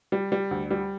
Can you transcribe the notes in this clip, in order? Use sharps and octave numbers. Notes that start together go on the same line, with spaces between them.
G3
G3
D2
G3